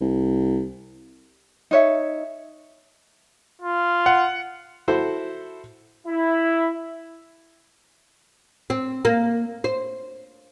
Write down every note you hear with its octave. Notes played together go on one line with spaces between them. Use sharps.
C2
D#4 C#5 E5
F4
F#5
E4 F#4 A4 C5
E4
C4
A#3
C5